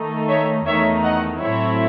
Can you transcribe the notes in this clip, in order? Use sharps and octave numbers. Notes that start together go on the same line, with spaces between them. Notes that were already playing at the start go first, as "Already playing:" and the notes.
Already playing: D#3 A3 D#4
C#5 E5
E2 D#3 A3 D#4 C#5 E5
D#5 F#5
A2 F#3 A3 C4 E4 C#5 E5